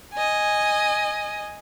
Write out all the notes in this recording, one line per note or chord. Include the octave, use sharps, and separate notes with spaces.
D#5 G#5